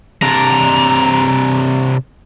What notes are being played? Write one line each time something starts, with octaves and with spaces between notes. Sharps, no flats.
C3 D4 A#5